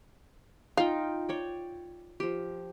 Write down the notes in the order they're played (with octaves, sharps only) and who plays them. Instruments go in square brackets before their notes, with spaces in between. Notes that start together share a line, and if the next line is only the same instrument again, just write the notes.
[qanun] D#4 F4 G5 [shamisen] F5
[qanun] C#5 D5 G5
F3 G4